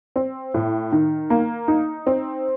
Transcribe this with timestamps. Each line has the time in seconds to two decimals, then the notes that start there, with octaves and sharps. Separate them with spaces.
0.16 C4
0.54 A2
0.92 D#3
1.30 A#3
1.68 D#4
2.07 C4